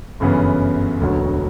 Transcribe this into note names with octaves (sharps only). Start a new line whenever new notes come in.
G1 F#2 C#3 E3 B3
E1 D2 D3 F#3 B3